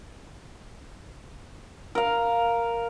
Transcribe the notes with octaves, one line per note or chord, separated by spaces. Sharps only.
A#4 F5